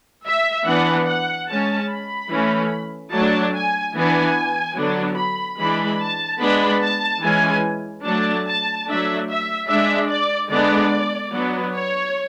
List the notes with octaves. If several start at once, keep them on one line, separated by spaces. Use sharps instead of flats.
E5
E3 B3 D4 F#5
F#5
G#3 C#4 A5
B5
E3 A3 C#4
F#3 A3 D4 A5
G#5
E3 B3 D4 G#5
D3 F#3 B3 D4
B5
E3 G#3 D4 B5
A5
G#3 B3 D4 B5
A5
E3 G#3 C#4 G#5
F#3 A3 D4 A5
A5
F#3 A3 D4 E5
E5
G#3 D4 E5
D5
D3 G#3 B3 D4 D5
F#3 B3 D4
C#5